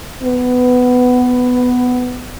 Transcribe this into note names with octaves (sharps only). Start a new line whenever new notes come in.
B3